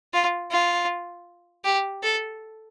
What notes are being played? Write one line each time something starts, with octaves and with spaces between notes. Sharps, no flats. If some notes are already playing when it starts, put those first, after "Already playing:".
F4
F4
G4
A4